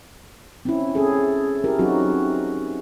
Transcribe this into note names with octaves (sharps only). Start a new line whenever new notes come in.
C4 C#4 E4
C#4 G#4 A4
E4 G4 A#4
F#3 C4 C#4 D#4 F#4